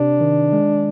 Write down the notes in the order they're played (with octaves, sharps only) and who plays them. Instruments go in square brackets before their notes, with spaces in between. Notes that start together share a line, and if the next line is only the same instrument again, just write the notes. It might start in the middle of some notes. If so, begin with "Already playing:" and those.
Already playing: [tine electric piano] C3 [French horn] D4
[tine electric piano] D#3
G#3